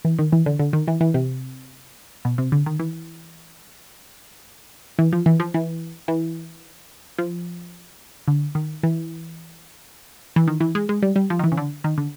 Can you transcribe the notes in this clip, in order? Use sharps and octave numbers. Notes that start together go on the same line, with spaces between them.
E3
D#3
E3
D3
D3
D#3
E3
E3
C3
B2
C3
D3
D#3
E3
E3
F3
E3
F3
E3
E3
F3
D3
D#3
E3
E3
D#3
E3
G#3
G#3
G3
G3
F3
D#3
E3
C#3
D3
D#3
D3